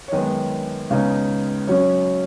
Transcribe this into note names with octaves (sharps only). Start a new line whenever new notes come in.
C#5
F#2 D#3 G#3 B3 D#5
C#2 C#3 B3 D#4
F#2 F#3 C#4 C#5